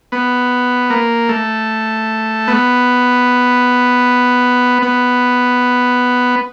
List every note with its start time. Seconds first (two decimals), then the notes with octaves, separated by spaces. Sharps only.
0.12 B3
0.90 A#3
1.29 A3
2.48 B3
4.82 B3